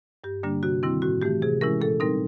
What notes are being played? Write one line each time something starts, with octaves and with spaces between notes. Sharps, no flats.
G2 G4
D3 G3 A#3 D4
C3 F#4
D#3 G3 C4 E4
A2 F#4
E3 A3 G4
C3 G#4
E3 G#3 C#4 E4 A#4
A#2 A4
G3 C4 D#4 A#4